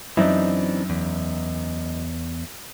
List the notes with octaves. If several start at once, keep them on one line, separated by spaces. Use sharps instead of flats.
F#2 E3 C4 D4 D#4 E5
E2